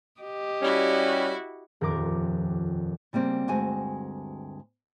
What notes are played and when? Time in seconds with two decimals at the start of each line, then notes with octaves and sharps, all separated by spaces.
0.21 G4 D#5
0.62 G3 C#4 E4 F#4
1.81 D#1 F2 A#4 D6
3.13 C#3 G3 A#3 C4
3.48 D2 G2 G#3 C4 F#4 G#5